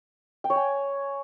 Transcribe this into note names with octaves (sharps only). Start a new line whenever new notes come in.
G5
C#5
G#5